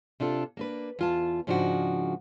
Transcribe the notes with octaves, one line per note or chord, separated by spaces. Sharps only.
C3 D4 F4 A4
A#3 D4 B4
E2 F4 A5
G#2 C#3 F3 D4 D#4 F#4